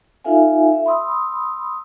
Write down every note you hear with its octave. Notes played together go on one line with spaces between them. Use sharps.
D#4 F4 A4 E5 F5 G#5
E5
B5 C6 D#6 E6